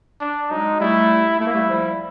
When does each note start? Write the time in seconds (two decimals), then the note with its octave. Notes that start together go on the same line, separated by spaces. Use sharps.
0.21 D4
0.51 F#3 G#3 D#4
0.80 G3 A3 E4
1.39 A3 E4
1.47 A#3
1.54 G3 A3
1.69 F3 G3